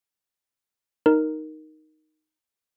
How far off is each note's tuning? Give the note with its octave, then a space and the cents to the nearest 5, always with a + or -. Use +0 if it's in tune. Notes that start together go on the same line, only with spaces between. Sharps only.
D#4 +0 A#4 +0